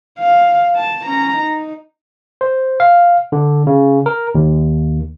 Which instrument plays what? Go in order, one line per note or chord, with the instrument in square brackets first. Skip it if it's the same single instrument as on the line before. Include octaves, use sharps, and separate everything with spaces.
[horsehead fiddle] F5
A5
C#4 A#5
D#4
[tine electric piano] C5
F5
D3
C#3
A#4
D#2